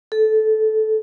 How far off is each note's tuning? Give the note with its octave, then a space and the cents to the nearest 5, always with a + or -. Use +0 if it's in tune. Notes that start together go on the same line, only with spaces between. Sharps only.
A4 -15